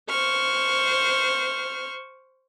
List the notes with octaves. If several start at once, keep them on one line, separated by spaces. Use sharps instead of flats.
C5 C#6 F6